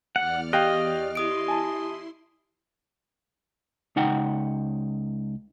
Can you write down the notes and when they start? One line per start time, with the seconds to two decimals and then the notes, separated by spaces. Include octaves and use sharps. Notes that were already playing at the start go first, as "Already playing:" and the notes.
0.16 E2 D5 F#5 F6
0.53 G4 D#5 F5 G5 F#6
1.15 E4 G4 C6 D#6 D7
1.48 G#5 A5
3.96 C#2 D#4 F#5 G5